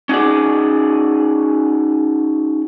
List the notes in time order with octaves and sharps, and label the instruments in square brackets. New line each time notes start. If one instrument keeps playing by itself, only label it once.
[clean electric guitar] C#4 D#4 F#4 G#4 D5